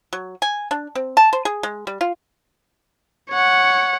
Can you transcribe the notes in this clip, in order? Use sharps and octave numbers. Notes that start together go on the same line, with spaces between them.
F#3
G#5
D4
C4
A5
C5
G#4
G#3
G3
F4
C#5 F#5